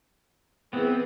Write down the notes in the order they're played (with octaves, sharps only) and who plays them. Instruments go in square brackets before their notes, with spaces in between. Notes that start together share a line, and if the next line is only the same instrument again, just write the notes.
[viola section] E3 G#4 [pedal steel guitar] B3 C4